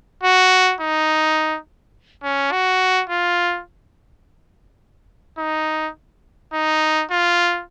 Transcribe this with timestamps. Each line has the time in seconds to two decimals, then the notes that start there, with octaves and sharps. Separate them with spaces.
0.23 F#4
0.81 D#4
2.23 C#4
2.52 F#4
3.10 F4
5.38 D#4
6.53 D#4
7.11 F4